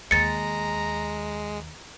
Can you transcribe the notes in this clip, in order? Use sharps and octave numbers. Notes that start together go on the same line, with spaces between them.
D#2 G#3 A#5 A6 C#7